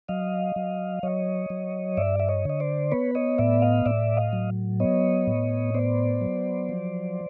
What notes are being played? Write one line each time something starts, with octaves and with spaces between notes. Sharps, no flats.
F#3 D#5 F5
F#3
F#3 C#5 D#5
F#3
G2 D5 E5
E5
C#5 D#5
D3 D#5
C5 D5
B3 B4 C#5
C#5 D#5
A2 D5 E5
D#5 F5
A2 D5 E5
D#5 F5
F#3
B3 C#5 D#5
A2
B3 C5 D5
F#3
F3